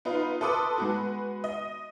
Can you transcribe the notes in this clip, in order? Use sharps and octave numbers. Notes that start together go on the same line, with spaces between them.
B3 D#4 F4
A4 B4 C6 D6 D#6
G#3 B3 F#4
D#5